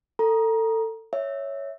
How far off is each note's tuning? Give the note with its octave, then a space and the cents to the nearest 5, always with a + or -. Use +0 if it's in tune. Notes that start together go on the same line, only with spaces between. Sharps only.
A4 +25 A#5 +20
C#5 +0 E5 -10